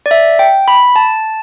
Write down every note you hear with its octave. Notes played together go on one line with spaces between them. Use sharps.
D5
E5
G5
B5
A5